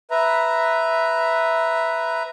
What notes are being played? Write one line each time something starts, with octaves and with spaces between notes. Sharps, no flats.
B4 E5 A#5